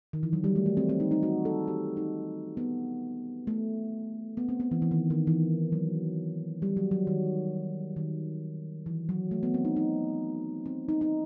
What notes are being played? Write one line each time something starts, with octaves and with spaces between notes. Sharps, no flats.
D#3
E3
F#3
G3
A3
A3
C4
C4
D#4
D#4
F#4
A4
G4
D#4
B3
A3
B3
C4
B3
E3
E3
D#3
D#3
E3
F#3
G3
F#3
F#3
D#3
D#3
E3
F#3
A3
B3
C4
D#4
D#4
C4
D#4
D#4